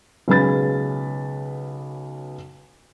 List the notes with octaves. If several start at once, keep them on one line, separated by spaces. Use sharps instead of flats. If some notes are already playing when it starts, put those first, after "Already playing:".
B1 C#3 G#3 B4 B5 A6